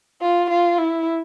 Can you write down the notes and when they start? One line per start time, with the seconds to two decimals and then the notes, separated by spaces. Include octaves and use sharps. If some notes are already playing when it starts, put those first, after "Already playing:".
0.22 F4
0.50 F4
0.78 E4